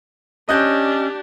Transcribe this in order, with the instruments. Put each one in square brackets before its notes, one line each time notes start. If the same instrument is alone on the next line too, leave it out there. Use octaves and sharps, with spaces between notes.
[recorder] C#4 [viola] D4 G4 [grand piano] D#5 F#6 G6